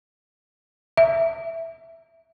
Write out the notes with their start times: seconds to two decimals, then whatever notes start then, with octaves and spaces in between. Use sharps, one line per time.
0.97 E5